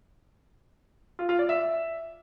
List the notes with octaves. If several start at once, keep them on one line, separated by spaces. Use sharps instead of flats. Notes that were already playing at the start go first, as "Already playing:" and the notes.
F4
F4
D5
E5